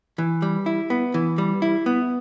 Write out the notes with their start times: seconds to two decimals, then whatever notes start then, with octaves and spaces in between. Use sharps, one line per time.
0.18 E3
0.42 G3
0.66 E4
0.90 B3
1.14 E3
1.38 G3
1.62 E4
1.86 B3